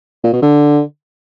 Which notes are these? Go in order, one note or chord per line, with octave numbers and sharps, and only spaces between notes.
A#2
B2
D3